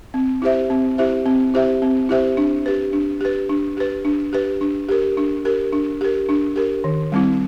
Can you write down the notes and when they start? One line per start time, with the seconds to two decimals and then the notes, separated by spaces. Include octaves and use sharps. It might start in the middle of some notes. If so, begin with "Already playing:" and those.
0.14 C4
0.42 E4 G4 C5 E5
0.70 C4
0.98 E4 G4 C5 E5
1.26 C4
1.54 E4 G4 C5 E5
1.82 C4
2.09 E4 G4 C5 E5
2.37 D4
2.66 G4 B4
2.93 D4
3.21 G4 B4
3.49 D4
3.77 G4 B4
4.05 D4
4.33 G4 B4
4.61 D4
4.89 G4 A#4
5.17 D4
5.45 G4 A#4
5.73 D4
6.01 G4 A#4
6.29 D4
6.56 G4 A#4
6.84 D#3
7.12 G3 C4 E4